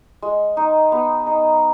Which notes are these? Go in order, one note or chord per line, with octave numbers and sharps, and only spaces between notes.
G#3
D#4
B3
D#4